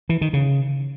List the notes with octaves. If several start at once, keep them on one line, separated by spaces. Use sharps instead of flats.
E3
D#3
C#3